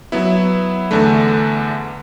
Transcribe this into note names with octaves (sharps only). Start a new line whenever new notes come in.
F#3 B3 E4
E2 D3 A3